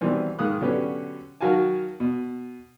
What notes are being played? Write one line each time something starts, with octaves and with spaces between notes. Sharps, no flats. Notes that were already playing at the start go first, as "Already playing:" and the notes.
B2 D#3 E3 G3 C4
G#2 D#3 F5 D#6 F#6
B2 D3 F#3 C#4 G4 B4
D#3 F#3 F#4 F5 G#5 A5
B2